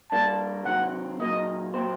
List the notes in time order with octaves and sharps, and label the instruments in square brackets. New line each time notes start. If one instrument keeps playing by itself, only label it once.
[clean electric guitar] G3 A#3 D4 [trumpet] A5
[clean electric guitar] C3 D#3 F#3 C4 [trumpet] F#5
[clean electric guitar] A#2 F#3 A#3 D#4 [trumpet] D#5
[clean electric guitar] A#2 F#3 C4 G4 C5